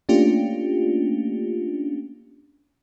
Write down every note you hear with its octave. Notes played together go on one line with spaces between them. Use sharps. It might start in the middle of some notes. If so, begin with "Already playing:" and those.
A3 A#3 C#4 D4 F4 G4